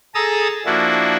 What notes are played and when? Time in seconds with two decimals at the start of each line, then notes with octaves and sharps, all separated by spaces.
0.15 G#4 A4 A5 A#5 D#6 E6
0.66 F3 A#3 D4 E4 F#4